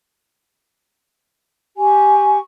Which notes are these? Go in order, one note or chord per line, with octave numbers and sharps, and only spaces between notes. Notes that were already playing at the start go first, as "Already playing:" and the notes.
G4 G#5 C#6